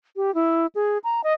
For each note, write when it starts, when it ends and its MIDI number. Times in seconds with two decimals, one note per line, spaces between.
0.16 0.34 67
0.35 0.66 64
0.75 0.98 68
1.04 1.21 82
1.24 1.33 75